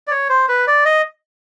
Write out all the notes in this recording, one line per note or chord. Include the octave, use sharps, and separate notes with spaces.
D5
C#5
C5
B4
D5
D#5